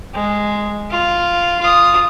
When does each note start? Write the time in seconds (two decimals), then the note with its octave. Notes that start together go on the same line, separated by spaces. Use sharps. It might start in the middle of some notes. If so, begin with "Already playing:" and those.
0.15 G#3
0.91 F4
1.61 F4 D#6